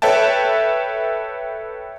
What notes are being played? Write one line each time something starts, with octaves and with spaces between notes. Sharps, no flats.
A4 B4 C#5 E5 G5 A5